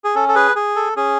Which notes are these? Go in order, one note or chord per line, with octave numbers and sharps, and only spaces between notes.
G#4
C#4 A4
A4
G#4 B4
G#4
A4
C#4 G#4